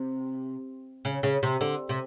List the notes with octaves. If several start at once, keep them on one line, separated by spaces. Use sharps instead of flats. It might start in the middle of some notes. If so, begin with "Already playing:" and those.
Already playing: C3
C#3
C#3
C3
D3
C3